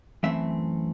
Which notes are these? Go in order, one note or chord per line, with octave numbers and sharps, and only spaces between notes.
F#2 E3 A3 C4 E5